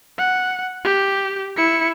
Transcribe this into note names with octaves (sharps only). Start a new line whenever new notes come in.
F#5
G4
E4 C#7